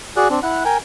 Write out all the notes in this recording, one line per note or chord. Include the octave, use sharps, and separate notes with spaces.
F#4 G#4 D5 F#6
C4 D4
E4 F#5 F#6
A#4 G5 G#5